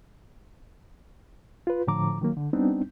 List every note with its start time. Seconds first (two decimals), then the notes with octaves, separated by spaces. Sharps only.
1.67 F4 B4
1.87 A2 D3 F3 A#5 D6
2.21 D#3 F#3 A#3
2.37 D3
2.53 G3 B3 C4 D4 D#4